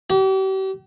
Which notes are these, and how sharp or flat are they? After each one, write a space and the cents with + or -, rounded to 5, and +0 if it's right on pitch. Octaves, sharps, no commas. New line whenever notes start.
G4 -40